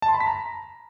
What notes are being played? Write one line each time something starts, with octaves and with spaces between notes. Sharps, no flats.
A5
C6
B5
B6
A#5